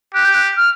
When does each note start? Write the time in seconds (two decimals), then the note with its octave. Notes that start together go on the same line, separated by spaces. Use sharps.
0.14 G4 F#6
0.25 G6
0.34 F#6
0.57 F6